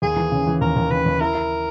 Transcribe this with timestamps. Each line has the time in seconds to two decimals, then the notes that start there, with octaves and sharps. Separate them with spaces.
0.02 D#2 G#4
0.16 E3
0.32 C#3
0.46 E3
0.61 D#2 A#4
0.76 D#2
0.90 C#3 B4
1.06 D#2
1.20 E4 A#4
1.35 E4